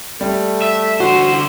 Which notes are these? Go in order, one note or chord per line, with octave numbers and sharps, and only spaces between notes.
G3 A3
E5
D3 F#4 C5